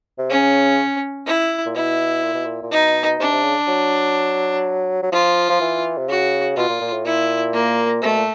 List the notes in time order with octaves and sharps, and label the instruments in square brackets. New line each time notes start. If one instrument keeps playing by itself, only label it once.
[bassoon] C3
[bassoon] C#3 [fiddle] C#4
[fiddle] E4
[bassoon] A#2
[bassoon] B2 [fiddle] E4
[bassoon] A#2
B2
A#2
A#2
[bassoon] B2 [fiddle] D#4
[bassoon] C3 [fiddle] D4
[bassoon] C3
C#3
F#3
F#3
[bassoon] F3 [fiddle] F4
[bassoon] F3
E3
C3
[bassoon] C#3 [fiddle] F#4
[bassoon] B2 [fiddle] F4
[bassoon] A#2
A#2
A2
[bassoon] A#2 [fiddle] E4
[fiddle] A#3
[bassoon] C3 [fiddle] A3
[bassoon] B2
A#2